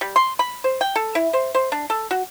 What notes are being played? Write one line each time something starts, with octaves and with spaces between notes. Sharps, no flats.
G3
C6
B5
C5
G5
A4
E4
C5
C5
D4
A4
F#4